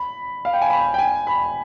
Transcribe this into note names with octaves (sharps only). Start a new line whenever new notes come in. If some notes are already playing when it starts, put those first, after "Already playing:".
Already playing: B5
F5
G5
G#5
B5
G5
G#5
B5